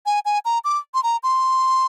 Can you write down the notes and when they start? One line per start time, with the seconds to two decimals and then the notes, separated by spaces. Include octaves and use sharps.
0.06 G#5
0.25 G#5
0.45 A#5
0.64 D6
0.94 C6
1.03 A#5
1.23 C6